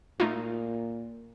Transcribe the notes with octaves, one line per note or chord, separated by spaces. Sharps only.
A#2 A3 D#4 F4